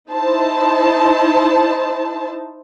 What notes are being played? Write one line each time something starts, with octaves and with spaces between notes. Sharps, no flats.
D#4 E4 C5 A5